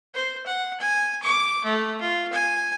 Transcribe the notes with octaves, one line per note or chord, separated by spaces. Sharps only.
C5
F#5
G#5
D6
A3
F4
G#5